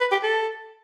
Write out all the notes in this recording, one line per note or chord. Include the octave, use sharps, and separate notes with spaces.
B4
G4
A4